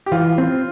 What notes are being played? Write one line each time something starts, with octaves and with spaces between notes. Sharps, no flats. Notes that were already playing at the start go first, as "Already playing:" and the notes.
G4
E3 F4
C4